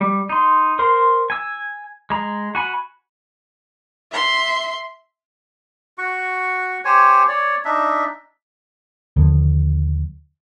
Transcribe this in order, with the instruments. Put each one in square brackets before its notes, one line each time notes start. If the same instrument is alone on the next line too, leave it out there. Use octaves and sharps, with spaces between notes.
[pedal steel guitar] G3
D#4 C6
A#4 C5 C6
G#5 E6
G#3 A#5
F#4 G#5 B5
[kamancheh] E5 C6
[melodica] F#4 C#6
G4 C5 C#5 G#5
C#5 D5
D4 D#4 E5
[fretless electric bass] D#2 D3 F3